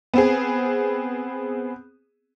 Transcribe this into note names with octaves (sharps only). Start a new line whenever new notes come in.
B3 C4 G#4